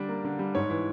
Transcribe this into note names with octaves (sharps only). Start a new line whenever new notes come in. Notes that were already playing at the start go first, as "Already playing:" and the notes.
Already playing: D3 G3 D4
A#3
D3
G3
G#2 C#5
E3